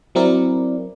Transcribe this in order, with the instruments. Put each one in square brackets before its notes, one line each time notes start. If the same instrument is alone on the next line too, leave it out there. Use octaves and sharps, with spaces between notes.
[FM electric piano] F#3 C4 E4 A#4 D5